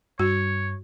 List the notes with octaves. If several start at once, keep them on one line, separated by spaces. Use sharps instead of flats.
G2 F#4 C#5